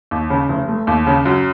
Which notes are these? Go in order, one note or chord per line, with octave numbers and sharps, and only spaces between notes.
D#2
C#3
F1
A3
D#2
C#3
F#2